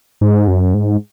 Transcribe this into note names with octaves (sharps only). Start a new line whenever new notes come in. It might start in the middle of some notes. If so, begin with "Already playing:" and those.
G#2
F#2
G#2